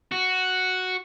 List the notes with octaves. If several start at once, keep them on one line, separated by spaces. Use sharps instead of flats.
F#4